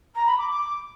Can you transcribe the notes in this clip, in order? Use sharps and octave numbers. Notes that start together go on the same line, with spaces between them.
A#5
B5
D6
D6